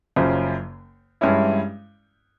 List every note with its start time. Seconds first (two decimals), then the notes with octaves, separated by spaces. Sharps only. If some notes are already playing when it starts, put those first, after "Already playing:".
0.16 F#1 F#2 C#3 F3
1.21 G2 E3 G#3 C#4 E4